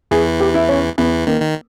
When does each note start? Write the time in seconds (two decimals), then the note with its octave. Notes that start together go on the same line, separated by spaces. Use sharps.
0.11 E2 E3 G#4
0.40 G4
0.54 E4
0.69 C#4
0.98 E2 E3 B3
1.27 D#3 A#3
1.42 D#3